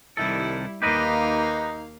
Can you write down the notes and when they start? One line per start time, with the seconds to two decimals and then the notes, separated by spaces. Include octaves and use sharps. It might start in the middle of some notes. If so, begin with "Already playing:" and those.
0.17 C2 D#3 G3 E4 A4
0.82 D#2 A#3 D#4 G4 B4 D#5 F5